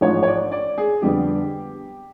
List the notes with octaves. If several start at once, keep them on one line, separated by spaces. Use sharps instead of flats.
A1 G#2 F3 C#5
C#5
D5
D5
G#4
F2 D3 G3 B3 G4